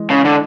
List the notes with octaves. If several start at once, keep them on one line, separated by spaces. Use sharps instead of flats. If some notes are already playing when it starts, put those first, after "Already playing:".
Already playing: E3 G#3
C#3
D3